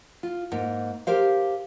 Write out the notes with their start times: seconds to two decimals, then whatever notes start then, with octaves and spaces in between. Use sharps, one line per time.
0.23 F4
0.52 G#2 A#3
1.07 G4 A#4 C5 F5